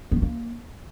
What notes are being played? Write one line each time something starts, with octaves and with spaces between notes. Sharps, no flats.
B3
D#3
A#3